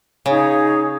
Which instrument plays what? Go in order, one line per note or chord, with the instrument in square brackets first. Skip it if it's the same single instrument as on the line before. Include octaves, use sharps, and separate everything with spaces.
[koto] C#3 [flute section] D#4 G#4 C#5